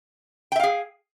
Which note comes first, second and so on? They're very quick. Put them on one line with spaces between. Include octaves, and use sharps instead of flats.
G5 E5 F5 G#4